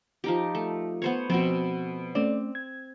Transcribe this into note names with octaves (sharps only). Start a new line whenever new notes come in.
F3 D#4 G4
A3
B3 C5 C#5
B2 F3 B3 C4
A3 C4 C#4 D5
G#6